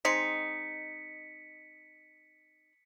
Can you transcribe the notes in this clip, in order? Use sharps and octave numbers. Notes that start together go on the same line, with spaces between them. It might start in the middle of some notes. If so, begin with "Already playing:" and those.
G#3 C4 D#4 B6 C#7